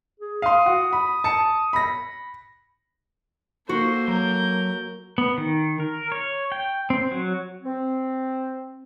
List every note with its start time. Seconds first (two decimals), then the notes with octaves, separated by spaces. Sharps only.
0.20 G#4
0.42 F5 C6 D#6
0.66 F#4
0.93 B5
1.24 A5 C#7
1.73 B5 A#6
3.69 A#3 F#4 A4 C5
4.08 F#3 A#4 G6
5.18 B3
5.38 D#3
5.80 A#4
6.12 C#5
6.52 G5
6.90 C4
7.11 F#3
7.64 C4